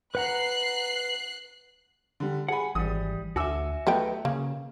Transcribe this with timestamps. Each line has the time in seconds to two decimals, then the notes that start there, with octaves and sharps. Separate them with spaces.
0.15 B4 F#5 A#5 F#6 C7
2.20 D3 G3
2.48 G#4 F#5 G#5 B5
2.75 G#1 E3 G3 D#6
3.36 D2 F#4 E5 G#5 D6 E6
3.87 D#3 F#3 A3 B3 G5
4.25 C#3 A#3